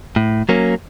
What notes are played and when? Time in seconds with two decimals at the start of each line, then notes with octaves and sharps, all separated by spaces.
0.16 A2
0.49 F#3 A#3 C#4